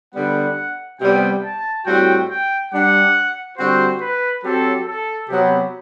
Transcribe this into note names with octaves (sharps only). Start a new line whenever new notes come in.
D3 G3 B3 F#5
C3 G3 B3 G5
A5
A2 G3 C4 F#4 G5
G5
G3 D4 G4 F#5
D3 G3 C4 F#4 C5
B4
F#3 C4 G4 A4
A4
C3 F#3 B3 G4